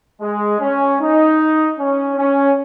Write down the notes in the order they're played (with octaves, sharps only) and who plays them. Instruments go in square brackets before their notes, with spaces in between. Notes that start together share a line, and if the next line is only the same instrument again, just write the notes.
[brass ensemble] G#3
C#4
D#4
C#4
C#4